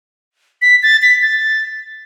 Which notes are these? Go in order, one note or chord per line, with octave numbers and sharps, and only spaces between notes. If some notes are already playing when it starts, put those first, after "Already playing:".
B6
A6
B6
A6